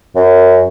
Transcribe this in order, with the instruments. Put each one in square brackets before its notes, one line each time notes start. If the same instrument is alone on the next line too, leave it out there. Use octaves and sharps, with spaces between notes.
[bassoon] F#2